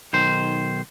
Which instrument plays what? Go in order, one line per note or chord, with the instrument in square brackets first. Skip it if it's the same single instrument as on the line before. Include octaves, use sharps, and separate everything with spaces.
[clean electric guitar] B1 D#3 C5